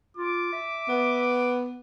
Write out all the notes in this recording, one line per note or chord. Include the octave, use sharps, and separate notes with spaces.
F4 D6
E5
B3